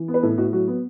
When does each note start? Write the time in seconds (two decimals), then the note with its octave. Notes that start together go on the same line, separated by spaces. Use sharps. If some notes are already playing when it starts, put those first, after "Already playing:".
Already playing: E3
0.08 B3
0.14 B4
0.23 A2 A4
0.38 A2 F#4
0.53 F#3 F#4
0.68 B3